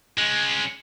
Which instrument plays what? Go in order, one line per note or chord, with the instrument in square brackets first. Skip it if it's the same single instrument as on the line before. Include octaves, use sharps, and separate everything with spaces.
[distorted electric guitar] G#3 C#4